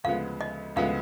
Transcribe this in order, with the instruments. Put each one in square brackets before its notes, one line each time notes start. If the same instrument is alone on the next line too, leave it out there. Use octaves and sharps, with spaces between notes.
[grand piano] D2 C#3 F3 G#3 B3 [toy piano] F5
[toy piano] D#5
[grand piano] D2 C#3 F3 G#3 B3 [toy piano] F5